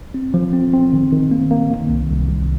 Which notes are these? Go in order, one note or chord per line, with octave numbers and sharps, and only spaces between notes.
C4
F3
C4
C4
D#3
D#3
A#3
A#3
D#3
C2
C2
C2